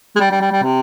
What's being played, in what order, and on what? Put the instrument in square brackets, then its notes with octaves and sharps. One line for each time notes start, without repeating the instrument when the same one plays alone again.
[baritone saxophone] G#3
G3
G3
G3
G3
C3